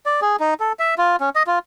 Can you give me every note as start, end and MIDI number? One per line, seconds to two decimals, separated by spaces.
0.06 0.20 74
0.22 0.36 68
0.40 0.54 63
0.60 0.72 69
0.79 0.94 76
0.98 1.16 65
1.20 1.30 61
1.35 1.43 75
1.47 1.59 65